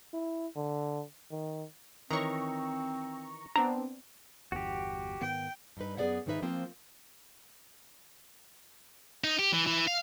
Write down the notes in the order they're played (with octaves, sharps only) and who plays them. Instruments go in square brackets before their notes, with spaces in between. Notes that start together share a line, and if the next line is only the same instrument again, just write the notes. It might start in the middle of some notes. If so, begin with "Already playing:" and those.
[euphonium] E4
D3
D#3
[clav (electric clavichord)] D#3 E3 C#5 [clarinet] C4 [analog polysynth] A#5 C#6
[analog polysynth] B3 C4 D4 [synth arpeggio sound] A#5
[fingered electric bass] G1 E2 [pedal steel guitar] F#4 G4
[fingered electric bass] G#2 D#3 B3 [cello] G5
[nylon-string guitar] G2 D#4 B4
F#2 B3 G#4 D5 E5 F#5
G#2 D#3 B3 D#4 B4 E5
F3 A#3 C4 F4 A#4
[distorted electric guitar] D#4
G4
E3
E3
F5